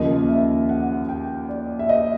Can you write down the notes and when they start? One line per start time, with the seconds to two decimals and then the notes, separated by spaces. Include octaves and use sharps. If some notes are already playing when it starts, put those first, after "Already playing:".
Already playing: D#2 C#3 F3 A#3 D#5
0.28 E5
0.69 F#5
1.09 G5
1.49 D5
1.79 E5
1.89 D#5